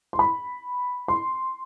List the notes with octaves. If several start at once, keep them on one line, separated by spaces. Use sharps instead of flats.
C6
B5
C6